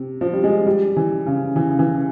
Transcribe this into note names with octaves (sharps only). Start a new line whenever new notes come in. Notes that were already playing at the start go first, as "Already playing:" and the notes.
Already playing: C3
F3
G3
G#3
G3
E3
C#3
E3
C#3
E3